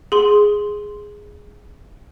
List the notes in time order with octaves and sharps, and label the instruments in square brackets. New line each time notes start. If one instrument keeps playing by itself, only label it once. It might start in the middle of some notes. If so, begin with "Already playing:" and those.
[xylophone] G#4 C6